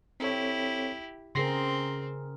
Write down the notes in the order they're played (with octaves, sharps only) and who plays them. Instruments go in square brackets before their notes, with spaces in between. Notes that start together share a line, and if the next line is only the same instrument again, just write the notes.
[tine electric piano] C4 A4 C#5 [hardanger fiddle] E4 G4
[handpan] C#3 G#4 A#4 [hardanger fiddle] C4 [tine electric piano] C6 A#6 C7